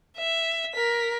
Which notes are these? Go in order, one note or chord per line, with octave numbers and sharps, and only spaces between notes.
E5
A#4 B6